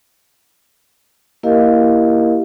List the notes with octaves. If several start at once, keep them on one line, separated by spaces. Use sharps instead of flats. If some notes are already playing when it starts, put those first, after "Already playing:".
A#3 E4 G4 A#4 D#5 F5